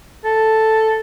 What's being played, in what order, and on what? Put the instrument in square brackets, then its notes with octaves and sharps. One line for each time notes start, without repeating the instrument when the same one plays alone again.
[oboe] A4